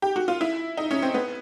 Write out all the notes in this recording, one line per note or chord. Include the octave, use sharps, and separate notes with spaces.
G4
F#4
F4
E4
D#4
C#4
C4
B3